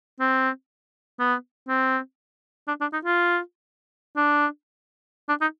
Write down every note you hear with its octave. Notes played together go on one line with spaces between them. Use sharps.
C4
B3
C4
D4
D4
D#4
F4
D4
D4
D#4